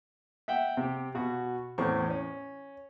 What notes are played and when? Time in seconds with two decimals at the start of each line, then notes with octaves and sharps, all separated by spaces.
0.48 E5 F#5 G5
0.77 C3 G4
1.15 B2 F#4
1.78 E2 A2 C4 C#4 C#6
2.10 C#4